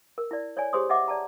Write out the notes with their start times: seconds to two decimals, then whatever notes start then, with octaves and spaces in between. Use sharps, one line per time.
0.18 A#4
0.31 E4 D5
0.57 C#5 D5 G#5
0.73 G4 G#4 C5 C#5 C6 D#6
0.90 D#5 E5 F#5 D6
1.08 D5 A5 A#5